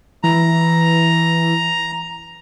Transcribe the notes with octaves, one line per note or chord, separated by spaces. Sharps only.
E3 A#5